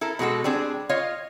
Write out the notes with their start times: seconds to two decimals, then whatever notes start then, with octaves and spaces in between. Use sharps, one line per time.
0.01 E4 A4 A#4
0.19 B2 G#3 F#4 A4
0.44 G3 C4 D4 G#4
0.89 F4 C#5 D#5 F5